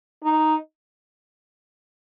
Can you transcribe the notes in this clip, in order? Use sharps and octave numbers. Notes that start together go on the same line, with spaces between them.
D#4